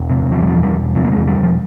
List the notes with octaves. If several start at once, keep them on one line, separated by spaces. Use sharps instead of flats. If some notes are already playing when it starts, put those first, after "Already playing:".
Already playing: E1
C3
E2 F3
G3
F3
E1
G3
E1
C3 F3
A#3
G#3
E2
G3
E1 F3